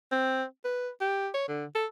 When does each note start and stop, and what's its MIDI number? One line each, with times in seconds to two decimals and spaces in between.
0.12 0.44 60
0.65 0.90 71
1.01 1.29 67
1.34 1.47 73
1.48 1.65 50
1.75 1.86 69